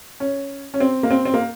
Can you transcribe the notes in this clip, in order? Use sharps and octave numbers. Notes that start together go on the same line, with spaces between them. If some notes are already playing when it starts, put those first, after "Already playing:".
C#4
C#4
C4
A#3
C4
C4
A#3